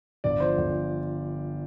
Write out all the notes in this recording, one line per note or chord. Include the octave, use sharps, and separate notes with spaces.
G1 D5
F3 C5
G1